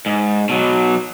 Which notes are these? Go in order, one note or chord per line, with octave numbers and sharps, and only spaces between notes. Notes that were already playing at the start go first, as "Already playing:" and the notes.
G#2
B2 F#3